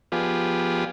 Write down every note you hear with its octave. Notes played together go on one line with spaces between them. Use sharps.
F3 B3 F4 G4 G#4 D5